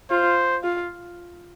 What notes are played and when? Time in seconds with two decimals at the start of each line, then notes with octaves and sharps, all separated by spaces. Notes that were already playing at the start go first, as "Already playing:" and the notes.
0.10 F4 C5
0.64 F4